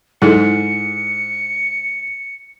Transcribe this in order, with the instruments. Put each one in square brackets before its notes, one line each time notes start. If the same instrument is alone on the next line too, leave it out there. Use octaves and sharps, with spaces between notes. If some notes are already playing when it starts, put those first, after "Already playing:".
[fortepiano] G#2 [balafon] E4 G#4 A4 [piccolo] C#7